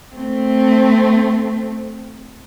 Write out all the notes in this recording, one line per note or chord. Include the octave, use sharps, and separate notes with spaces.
A3 C4